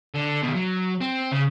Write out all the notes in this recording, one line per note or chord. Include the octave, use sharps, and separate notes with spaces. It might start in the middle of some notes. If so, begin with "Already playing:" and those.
D3
B2 D#3
F#3
C4
C#3